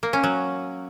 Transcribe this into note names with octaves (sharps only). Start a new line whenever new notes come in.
A#3
C#4
F#3